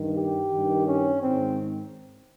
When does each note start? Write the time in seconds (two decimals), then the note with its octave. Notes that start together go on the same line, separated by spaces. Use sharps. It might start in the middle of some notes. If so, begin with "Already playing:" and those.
Already playing: G2 D#3
0.17 G4
0.52 G2 D#3
0.87 C#4
1.22 G#2 D#3 C4